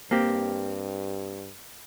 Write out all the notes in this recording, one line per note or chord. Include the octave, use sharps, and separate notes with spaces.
G2 A#3 C4 G4